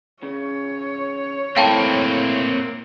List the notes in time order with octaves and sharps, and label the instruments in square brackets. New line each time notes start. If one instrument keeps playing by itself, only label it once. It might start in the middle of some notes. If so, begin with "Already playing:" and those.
[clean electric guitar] C#3 [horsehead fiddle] C#5
[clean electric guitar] A3 E4 [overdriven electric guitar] A#3 C4 [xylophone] F5 G5 A5